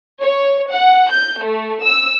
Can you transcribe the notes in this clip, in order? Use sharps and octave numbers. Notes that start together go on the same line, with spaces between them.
C#5
F#5
G6
A3
E6